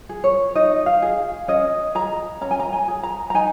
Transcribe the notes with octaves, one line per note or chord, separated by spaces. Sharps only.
G#4
C#5
D#4 D#5
F5
G#4
C#4 D#5
G#4 A#5
C#4 A#5
G#5
A#5
G#5
G#4
A#5
A#5
D#4 G#5